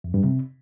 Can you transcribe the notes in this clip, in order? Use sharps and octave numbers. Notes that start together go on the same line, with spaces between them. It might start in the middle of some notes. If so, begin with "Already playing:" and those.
F2
G2
C3